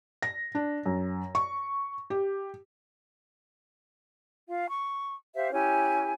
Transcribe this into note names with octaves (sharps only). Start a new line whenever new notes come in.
A#6
D4
F#2
C#6
G4
F4 F5
C#6
G4 C5 E5 F5
C#4 E4 G4 G#5